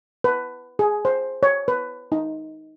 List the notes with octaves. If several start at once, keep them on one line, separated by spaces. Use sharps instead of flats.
B4
G#4
C5
C#5
B4
D#4